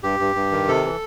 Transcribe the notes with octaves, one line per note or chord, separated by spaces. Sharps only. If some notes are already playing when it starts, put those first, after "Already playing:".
G2 G4
G2
G2
D#3
C3 A4
E3